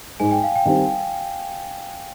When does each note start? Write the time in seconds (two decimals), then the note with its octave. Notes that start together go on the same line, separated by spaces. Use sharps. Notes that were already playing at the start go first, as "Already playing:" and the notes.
0.20 G#2 G#5
0.31 G5
0.44 F5
0.56 G5
0.66 D#3 G3 C4